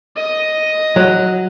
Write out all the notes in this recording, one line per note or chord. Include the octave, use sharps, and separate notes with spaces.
D#5
F#3